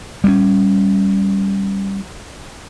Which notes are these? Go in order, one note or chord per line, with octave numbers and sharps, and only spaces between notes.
G3 G#3 C#4